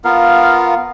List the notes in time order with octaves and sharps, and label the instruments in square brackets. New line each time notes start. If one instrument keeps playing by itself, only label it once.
[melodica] B3 F4 A#4 F5